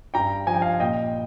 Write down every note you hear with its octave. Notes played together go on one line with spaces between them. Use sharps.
G2 G5 A#5
F3 G#5
G5
F5 G#5
A#2 D#5 G5